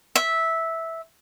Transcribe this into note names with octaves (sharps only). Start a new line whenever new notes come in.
E5